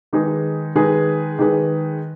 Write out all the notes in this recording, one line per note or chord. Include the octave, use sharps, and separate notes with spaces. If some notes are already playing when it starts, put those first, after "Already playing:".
D#3 G#3 D#4 G#4 B4
D#3 G#3 D#4 G#4 B4
D#3 G#3 D#4 G#4 B4